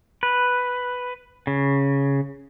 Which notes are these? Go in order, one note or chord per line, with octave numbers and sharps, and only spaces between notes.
B4
C#3